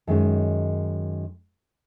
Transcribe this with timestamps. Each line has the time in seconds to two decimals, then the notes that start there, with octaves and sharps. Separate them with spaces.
0.07 F#2 D#3 G#3 C#4 D#4